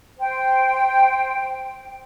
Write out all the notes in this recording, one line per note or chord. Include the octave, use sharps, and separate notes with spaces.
C5 G5